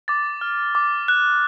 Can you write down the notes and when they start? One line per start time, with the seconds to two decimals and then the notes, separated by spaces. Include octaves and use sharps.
0.08 D6 A6
0.41 F6
0.75 D6
1.08 F#6